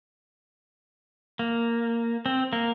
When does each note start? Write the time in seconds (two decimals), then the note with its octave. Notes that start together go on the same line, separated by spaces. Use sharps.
1.39 A#3
2.26 C4
2.53 A#3